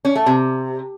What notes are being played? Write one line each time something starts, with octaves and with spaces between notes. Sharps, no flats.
C#4
A3
C3